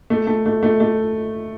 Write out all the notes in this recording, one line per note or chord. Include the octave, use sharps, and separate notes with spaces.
A3
A3
A3
A3
A3